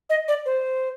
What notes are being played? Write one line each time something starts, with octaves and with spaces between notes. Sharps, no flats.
D#5
D5
C5